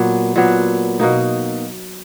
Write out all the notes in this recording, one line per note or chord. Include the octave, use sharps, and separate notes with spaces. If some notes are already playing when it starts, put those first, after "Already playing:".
Already playing: A#2 F#3 B3
A#2 F#3 B3
B2 A#3 D#4